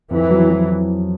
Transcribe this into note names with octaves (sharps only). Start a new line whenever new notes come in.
F2 E3
F#3
F#3